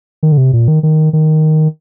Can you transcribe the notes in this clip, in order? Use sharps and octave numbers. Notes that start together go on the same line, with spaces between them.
D#3
D3
C3
A#2
D#3
D#3
D#3